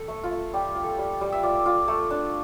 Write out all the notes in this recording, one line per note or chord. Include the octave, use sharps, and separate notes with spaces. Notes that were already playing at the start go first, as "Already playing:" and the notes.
Already playing: A4
A3
F4
A3
G3 G4
F4
A4
G3
G3
E5
F4 D5
F4
A3
D4